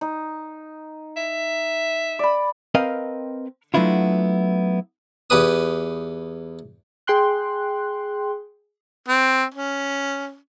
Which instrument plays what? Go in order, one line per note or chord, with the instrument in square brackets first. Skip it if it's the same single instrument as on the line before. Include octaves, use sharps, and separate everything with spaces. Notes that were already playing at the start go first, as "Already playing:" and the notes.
[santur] D#4
[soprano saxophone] E5
[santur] D5 B5
[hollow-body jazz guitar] C4 A#4 B4 D#5 F5 G5
F#3 A3 B3 D4 E4 F4
[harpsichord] E2 G4 B4 D#6
[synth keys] G#4 G5 C6 F#6
[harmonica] C4
C#4